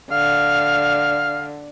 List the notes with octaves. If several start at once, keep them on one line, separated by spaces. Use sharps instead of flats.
D3 F5